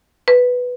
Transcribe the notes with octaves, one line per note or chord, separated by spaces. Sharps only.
B4